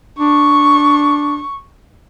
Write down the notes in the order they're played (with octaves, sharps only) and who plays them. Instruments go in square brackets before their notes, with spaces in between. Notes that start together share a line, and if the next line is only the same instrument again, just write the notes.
[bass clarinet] D4 [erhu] C#6